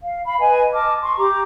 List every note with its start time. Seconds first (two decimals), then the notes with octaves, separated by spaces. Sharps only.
0.01 F5
0.25 F5 B5
0.40 B4 D#5 G#5
0.73 D#5 A5 D6 F6
1.02 C6 C#6
1.17 G4 A#5 D6